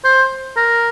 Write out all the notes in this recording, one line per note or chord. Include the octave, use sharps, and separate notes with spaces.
C5
A#4